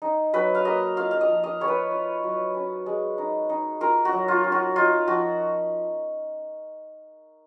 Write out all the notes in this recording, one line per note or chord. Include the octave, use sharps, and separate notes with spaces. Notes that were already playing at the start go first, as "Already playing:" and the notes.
D#4
F#3 B4
F5
A#3 D#5
F4 F5
F5
D#5
F3
D#5
B3 C#5
B4
F4
F#3
C#4
G#3
D#4
D#4
F4 A#4
F#4
F#3
F4
C#4
F#4
D#4 F4
F3 F#4